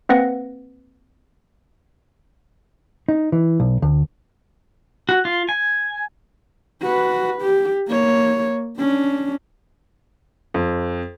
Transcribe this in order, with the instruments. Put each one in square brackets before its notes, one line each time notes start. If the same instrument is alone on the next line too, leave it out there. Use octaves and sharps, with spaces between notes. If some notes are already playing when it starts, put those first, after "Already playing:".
[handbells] A#3 C4 B4 F#5 A#6
[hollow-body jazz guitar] D#4
E3
B1
D2
[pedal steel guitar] F#4
F4
G#5
[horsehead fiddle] F#4 B4
G4
A#3 C#5
C#4 D4
[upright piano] F2